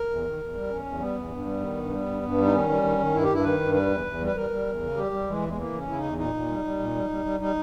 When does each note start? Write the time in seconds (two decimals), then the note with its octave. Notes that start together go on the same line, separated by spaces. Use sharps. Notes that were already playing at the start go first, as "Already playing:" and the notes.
Already playing: A#4
0.09 E2
0.25 D#3
0.40 E2
0.55 G3
0.70 E2 C#4
0.85 E2
1.00 G3 B3
1.16 E2
1.31 G2
1.46 G3
1.61 D#3
1.76 G2
1.92 G3
2.07 G2
2.22 G2
2.38 G3
2.45 D#4
2.53 D#3 C#4
2.69 G3
2.83 D#3
2.99 D#3
3.14 G2 E4
3.24 G4
3.29 G2 E4
3.44 D#3 B4
3.60 G2
3.74 G3 B4
3.90 E2
4.06 E2
4.20 G3
4.27 B4
4.36 G3 A#4
4.50 G3
4.67 E2
4.81 C#3
4.97 G3 G4
5.12 G3
5.28 E3 G#3
5.42 E2
5.48 G#3
5.57 E3 A#3
5.73 C#3
5.78 C#4
5.87 C#3 E4
5.98 D#4
6.03 E2
6.18 A#2 D#4
6.34 A#2
6.49 G3
6.64 G3
6.79 A#2
6.95 G3
7.10 G3
7.25 G3
7.40 G3 D#4